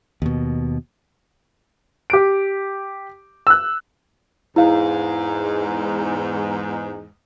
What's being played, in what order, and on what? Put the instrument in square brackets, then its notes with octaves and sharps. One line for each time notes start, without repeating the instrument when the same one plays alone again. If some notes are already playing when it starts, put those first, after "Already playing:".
[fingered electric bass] D#2 B2
[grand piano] G4 D7
E6 F#6
[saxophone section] E2 G#2 [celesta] E4 F5